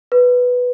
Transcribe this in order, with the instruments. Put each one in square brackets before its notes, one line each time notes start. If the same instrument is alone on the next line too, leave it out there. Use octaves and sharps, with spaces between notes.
[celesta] B4